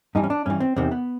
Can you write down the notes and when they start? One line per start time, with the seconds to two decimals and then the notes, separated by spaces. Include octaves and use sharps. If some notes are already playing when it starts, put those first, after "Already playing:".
0.15 G2 E3 D#4
0.24 C#4
0.30 D4
0.46 G2 E3 C#4
0.60 C4
0.76 E2 C3 D#3 C4
0.91 B3